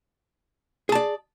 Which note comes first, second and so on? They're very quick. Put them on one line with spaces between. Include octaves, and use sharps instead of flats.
G#4 A5 D5